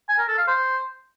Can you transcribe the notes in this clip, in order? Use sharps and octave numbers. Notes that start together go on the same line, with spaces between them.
G#5
A#4
A4
F5
C5